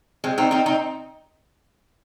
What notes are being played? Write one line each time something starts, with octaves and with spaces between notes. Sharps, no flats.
G#3 C4
C4 D#4
C4 D#4
C4 D#4